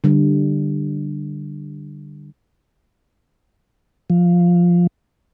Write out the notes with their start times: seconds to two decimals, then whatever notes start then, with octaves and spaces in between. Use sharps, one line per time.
0.04 D3 G3
4.10 F3